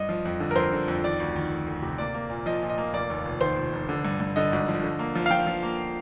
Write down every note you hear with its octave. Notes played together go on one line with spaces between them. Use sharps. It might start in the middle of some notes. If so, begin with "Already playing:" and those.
Already playing: G2 D#5
F3
F2
D3
A#4
F2 C5
D3
F2
D#3 D5
D2
D#3
D2
D2
C3
A#3 D5
A#3
A#2
F3 D#5
A#2
D#5
A#3
F1 D5
D#2
F1
D#3 C5
F1
F1
D3
G2
G2
D3 D#5
G#1
F3
D3
A#3
F3
F5
F3 G5
F3
A#3